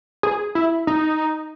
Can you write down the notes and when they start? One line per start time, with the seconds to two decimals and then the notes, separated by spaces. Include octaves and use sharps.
0.23 G#4
0.55 E4
0.87 D#4